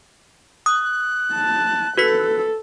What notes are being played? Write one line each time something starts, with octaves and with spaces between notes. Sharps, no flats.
D#6 F#6
A5
F#4 A4 B4 B6